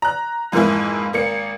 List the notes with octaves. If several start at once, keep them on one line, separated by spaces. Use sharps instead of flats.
A#5 F#6
F2 G#2 E3 A#3 E4
G#1 A#3 C#7